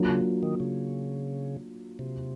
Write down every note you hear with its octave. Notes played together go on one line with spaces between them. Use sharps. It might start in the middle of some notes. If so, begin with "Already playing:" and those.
Already playing: F#3 A#3 D4 F4 A#4
C#3
D#3
C#3
C3